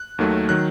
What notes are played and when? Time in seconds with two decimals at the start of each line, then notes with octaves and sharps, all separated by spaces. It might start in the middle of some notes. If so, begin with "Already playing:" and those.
Already playing: F#6
0.19 D#2 D#3 F#3 A3
0.49 D#3 F#3 F#6